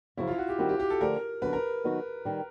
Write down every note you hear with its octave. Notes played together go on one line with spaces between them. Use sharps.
F#2 C#3 F3 E4
F4
F#4
G4
D#3 G3 C4 F#4
G4
G4
A4
D3 F3 A3 D4 G4 A#4
F#2 D3 F#3 B3 B4
A#4
D#3 F#3 B3 D#4 F#4
D#3 G3